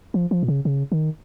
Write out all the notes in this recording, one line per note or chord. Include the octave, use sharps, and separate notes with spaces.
F3
F3
A#2
C#3
C#3
D#3